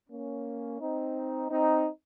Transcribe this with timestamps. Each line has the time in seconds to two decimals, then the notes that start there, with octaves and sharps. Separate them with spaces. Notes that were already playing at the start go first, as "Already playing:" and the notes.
0.10 A#3 C#4
0.80 C4 D#4
1.50 C4 D#4